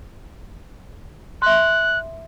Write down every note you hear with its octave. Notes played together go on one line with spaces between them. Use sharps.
E5 C6 F#6